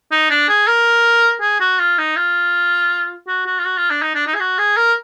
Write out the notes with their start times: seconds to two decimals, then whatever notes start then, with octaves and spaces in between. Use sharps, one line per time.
0.11 D#4
0.30 D4
0.49 G#4
0.67 A#4
1.41 G#4
1.60 F#4
1.79 F4
1.98 D#4
2.16 F4
3.28 F#4
3.46 F#4
3.59 F4
3.65 F#4
3.77 F4
3.90 D4
4.02 D#4
4.15 D4
4.27 D#4
4.34 G#4
4.40 F#4
4.59 G#4
4.77 A#4